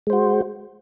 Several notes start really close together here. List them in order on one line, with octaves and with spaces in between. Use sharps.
G#3 C5 F#4